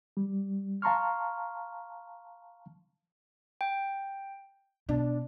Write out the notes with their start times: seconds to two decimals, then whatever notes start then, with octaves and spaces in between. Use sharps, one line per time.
0.17 G3
0.82 F5 A5 A#5 C6 C#6 F6
3.61 G5
4.89 B2 D4